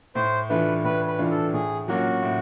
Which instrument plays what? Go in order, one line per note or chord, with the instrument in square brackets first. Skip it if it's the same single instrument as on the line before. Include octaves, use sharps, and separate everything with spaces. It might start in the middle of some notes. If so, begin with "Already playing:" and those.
[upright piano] A2 [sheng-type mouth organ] C5
[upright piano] E3 A3 D4 F4 [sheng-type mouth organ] B4
[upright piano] A2 [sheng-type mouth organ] B4
[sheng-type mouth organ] B4
[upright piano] E3 A3 D4 F4
[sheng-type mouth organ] A4
[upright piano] A2 [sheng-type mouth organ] G#4
[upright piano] F#3 A#3 C#4 F4 [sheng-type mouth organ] F#4
[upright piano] A2